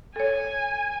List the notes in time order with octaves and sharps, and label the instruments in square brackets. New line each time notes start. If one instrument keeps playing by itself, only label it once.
[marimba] A4 C#5 [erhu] G#5